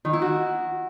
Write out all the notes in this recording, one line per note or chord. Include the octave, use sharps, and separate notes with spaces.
D#3
E4
F#4